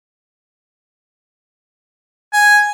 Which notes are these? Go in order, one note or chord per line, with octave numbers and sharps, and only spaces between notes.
G#5